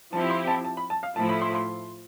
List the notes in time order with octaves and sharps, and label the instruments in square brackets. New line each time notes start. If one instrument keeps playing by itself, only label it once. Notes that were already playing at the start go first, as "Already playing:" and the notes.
[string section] F3 C4 E4 G4 [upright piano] A5
[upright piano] C6
A5
A5
B5
A5
F5
[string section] A2 F3 A3 E4 [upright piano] A5
[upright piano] B5
C6
C6